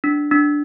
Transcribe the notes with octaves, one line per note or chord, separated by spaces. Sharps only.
D4
D4